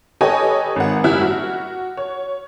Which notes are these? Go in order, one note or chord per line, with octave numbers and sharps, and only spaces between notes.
G4 A4 B4 C#5 D#5 G#5
G#1 F#5
F#1 G3 E4 F6 F#6
F#4
C#5